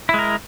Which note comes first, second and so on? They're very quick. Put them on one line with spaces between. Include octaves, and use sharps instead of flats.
E4 G#3 A#4